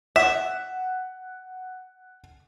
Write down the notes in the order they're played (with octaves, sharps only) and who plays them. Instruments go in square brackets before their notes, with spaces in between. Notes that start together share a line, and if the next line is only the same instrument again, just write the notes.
[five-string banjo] E5 [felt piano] F#5